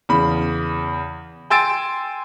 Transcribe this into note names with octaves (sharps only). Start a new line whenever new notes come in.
E2 C#3 B5
G5 G#5 C6 E6 A6 D7